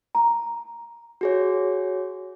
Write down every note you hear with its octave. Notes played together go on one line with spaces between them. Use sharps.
A#5
F#4 G#4 C#5